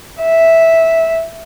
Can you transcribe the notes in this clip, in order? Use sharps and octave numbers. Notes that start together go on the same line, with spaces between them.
E5